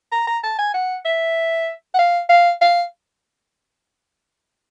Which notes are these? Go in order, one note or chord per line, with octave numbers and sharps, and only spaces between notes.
A#5
A#5
A5
G#5
F#5
E5
F#5
F5
F5
F5